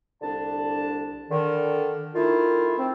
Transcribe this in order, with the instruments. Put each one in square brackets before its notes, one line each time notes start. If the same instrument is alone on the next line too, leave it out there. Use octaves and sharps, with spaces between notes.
[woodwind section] C2 D3 D4 A5
D3 D#3
D#3 A3 E4 F4
C4